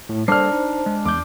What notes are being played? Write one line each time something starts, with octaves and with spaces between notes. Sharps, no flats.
A2
G3 A#3 D4 A4 C5 F6 C7
D#4
G#3
E2 D6 G6